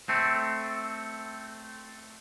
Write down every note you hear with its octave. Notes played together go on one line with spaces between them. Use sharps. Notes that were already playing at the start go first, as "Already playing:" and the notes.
A3 C4